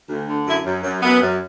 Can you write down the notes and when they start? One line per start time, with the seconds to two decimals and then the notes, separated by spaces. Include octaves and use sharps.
0.09 D2
0.28 D3
0.46 F#2 E4
0.65 F#2
0.84 F#2
1.02 F#2 B3
1.21 F#2